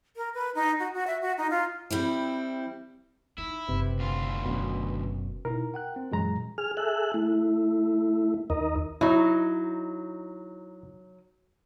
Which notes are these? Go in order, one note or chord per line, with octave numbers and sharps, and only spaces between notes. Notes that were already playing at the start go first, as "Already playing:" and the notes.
A#4
B4
D#4
F#4
F#4
E5
F#4
D#4
F4
G3 C4 E4
D#4 E4
F#1 C3 B4
D2 F4
F#2 B2
B2 D#4 E4 A#4
F#5 G5 F#6
C4
F#2 A#2 E3 F#3 G#3 A#5
G#4 F6
G#4 A4 E5 F#6
A3 E4
D#2 D#4 A#4 D#5
F#3 D#4 E4